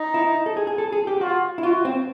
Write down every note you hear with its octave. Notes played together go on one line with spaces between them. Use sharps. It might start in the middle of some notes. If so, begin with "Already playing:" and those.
Already playing: D#4
E4
A4
G#4
G#4
A4
G#4
G4
F4 F#4
E4
F4 F#4
C4